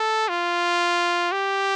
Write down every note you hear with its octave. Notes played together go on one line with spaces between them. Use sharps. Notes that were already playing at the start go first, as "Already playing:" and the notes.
Already playing: A4
F4
G4